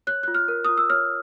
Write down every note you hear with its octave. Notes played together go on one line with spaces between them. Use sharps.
C#5 F#6
F4 F#6
F6
A#4
F4 D#6
E6
C#5 F6